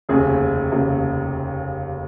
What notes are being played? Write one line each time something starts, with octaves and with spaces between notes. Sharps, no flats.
F1 D#2 C#3 G#4
F1 D#2 C#3